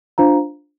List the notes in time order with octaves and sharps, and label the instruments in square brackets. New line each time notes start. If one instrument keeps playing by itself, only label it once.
[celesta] D4 F4 C5 F5 A#5